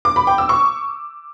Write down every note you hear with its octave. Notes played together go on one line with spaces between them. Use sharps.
D6
B5
G5
E6
C#6